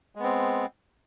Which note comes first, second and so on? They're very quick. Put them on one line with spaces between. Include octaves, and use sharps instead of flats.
G#3 B3 C4